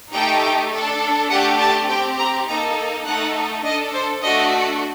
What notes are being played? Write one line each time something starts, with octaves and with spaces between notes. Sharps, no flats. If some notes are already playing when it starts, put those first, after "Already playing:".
A3 D#4 G4 G5
D4 A4
A3 D4 G4 F#5
A5
C4 G4 G5
A#5
A#3 D#4 A4 A#5
A3 D#4 A4 F#5
D4 A4 D#5
C5
A3 D4 F#4 D#5